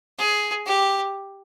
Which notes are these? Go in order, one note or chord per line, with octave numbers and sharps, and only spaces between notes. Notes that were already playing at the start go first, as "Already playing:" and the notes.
G#4
G4